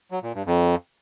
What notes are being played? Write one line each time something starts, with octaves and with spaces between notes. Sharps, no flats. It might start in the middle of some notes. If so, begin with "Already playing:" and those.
F#3
A#2
G2
F2